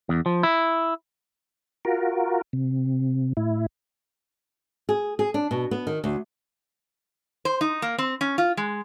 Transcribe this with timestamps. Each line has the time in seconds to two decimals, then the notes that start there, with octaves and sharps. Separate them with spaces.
0.09 E2
0.26 F3
0.43 E4
1.85 F4 F#4 A#4
2.53 C3
3.37 A2 E4
4.89 G#4
5.19 G#4
5.34 D4
5.51 B2
5.71 B3
5.87 D#3
6.04 D2
7.45 C5
7.61 D#4
7.82 A#3
7.98 C4
8.21 C#4
8.38 F4
8.57 G#3